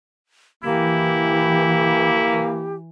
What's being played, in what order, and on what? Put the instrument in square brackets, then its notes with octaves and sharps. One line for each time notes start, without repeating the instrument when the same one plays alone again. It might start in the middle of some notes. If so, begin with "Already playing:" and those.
[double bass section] E3 [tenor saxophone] A#3 [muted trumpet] E4 [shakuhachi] G4